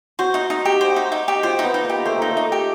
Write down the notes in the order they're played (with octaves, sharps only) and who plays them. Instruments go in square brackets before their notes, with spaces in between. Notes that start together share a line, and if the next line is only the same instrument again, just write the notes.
[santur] F#4 [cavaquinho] C5
[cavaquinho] D#4
D#4
G4
C5
D#4
D#4
G4
[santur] F4 [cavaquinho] C5
[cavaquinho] D#4
[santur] B3
[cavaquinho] D#4
[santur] A#3
[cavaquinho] G4
[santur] A3 [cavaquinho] C5
[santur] A#3 [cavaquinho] D#4
[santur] A3
[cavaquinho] D#4
G4